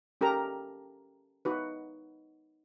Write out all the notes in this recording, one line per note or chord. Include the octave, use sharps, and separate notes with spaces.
C#4 G4 A4 A#4 A#5
D#4 F#4 B4